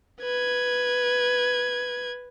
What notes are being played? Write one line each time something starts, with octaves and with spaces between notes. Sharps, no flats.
B4 G#6